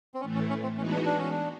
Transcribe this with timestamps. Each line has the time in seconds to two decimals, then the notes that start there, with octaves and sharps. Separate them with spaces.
0.14 C4
0.21 A2 E3 A3 C#4
0.35 C#4
0.49 C#4
0.63 C4
0.77 E3 G#3 B3 C#4 D#4 F#4
0.91 D4
1.05 D4
1.18 C#4
1.31 D4